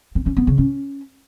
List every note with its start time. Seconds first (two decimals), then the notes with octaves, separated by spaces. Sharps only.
0.15 C4
0.26 C#4
0.37 B3
0.47 C#3
0.58 C#4